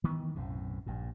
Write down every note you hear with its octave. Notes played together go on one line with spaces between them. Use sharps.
D#3 E3 B3
B1 F#2 A2 C3
A#1 G2 A#2